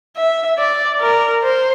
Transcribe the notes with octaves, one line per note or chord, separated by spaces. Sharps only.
E5
D5
A#4
C5